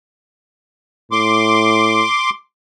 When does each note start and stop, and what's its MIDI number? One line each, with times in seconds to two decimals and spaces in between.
1.12 2.04 45
1.12 2.30 84
1.12 2.30 86